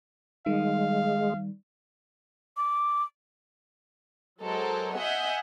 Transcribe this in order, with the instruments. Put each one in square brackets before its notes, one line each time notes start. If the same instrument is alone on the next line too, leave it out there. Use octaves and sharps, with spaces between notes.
[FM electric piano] D#3 [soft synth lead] G3 [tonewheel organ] G#3 [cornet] F5
[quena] D6
[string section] F#3 G#3 A4 A#4 C5
D#5 E5 F#5 G#5 G6